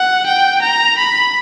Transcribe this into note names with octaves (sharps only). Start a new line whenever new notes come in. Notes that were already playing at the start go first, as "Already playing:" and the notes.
Already playing: F#5
G5
A#5
B5